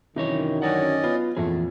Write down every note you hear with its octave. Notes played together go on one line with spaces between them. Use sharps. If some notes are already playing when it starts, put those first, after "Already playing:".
F#2 C3 D#3 E3 D#4 C#5
D3 F#3 C#4 D5 D#5 F#5
B3 F4
F2 A#2 E3 A3 G#4